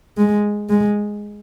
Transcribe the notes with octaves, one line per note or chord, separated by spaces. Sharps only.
G#3
G#3